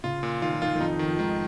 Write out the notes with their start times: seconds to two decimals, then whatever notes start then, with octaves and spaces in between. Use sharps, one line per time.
0.04 C#3 F4
0.23 A#2
0.42 D#3 F4
0.52 F3
0.62 D#3 F4
0.75 D#3
0.80 F2 F3 D#4
0.99 D#3
1.07 F3
1.19 G#2 D#3 G#3